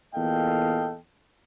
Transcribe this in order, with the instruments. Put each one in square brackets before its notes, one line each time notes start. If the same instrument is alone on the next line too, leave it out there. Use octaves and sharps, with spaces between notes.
[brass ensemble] E2 A#2 A4 D#5 F5 G5